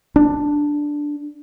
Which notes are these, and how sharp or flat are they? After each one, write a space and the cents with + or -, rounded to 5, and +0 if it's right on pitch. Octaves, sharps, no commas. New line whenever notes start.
D4 +0